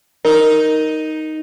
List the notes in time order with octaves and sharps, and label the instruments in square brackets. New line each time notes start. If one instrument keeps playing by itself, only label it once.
[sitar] D#4 [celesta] A#4